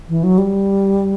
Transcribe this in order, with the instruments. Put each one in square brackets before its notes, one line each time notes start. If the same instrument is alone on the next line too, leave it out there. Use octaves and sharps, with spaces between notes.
[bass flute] E3
F#3
G3